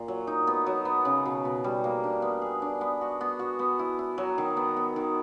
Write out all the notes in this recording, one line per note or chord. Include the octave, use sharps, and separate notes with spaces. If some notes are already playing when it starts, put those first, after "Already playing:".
Already playing: A#2
F#3
D#4
B3
F#3
B3
C#3
B2
B2
G3
A#3
D4
B3
G#4
D4
B3
F#4
B3
F#4
B3
E4
E4
F#3
D#3
B3
B3
D#3